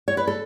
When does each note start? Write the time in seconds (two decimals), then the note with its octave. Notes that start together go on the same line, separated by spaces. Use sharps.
0.08 C#5
0.17 B4
0.27 A4